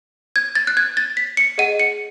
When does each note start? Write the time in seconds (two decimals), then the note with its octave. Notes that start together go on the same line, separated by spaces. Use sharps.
0.36 G#6
0.55 A6
0.67 F#6
0.77 G#6
0.97 A6
1.17 B6
1.37 C#7
1.58 G#4 D#5 F#5 D#7
1.80 C#7